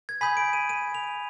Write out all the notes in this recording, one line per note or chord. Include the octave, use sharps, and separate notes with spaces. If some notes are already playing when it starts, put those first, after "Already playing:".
G#6
G#5 B5 D#6 G6 B6
D7
D#7
D#7
F7